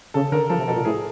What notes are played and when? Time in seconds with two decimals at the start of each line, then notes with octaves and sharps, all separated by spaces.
0.14 C#3 A4
0.32 D3 A#4
0.49 F3 A4
0.58 C3
0.67 B2 A4
0.76 A#2
0.85 A2 G#4